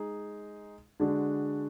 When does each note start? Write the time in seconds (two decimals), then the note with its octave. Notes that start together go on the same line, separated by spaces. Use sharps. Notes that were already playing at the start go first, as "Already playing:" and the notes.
Already playing: G#3 D#4 G#4
1.00 D3 G#3 D4 F#4